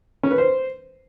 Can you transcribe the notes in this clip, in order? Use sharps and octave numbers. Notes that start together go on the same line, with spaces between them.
C#4
B4
C5